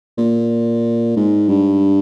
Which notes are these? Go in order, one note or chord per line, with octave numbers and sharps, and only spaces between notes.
A#2
G#2
G2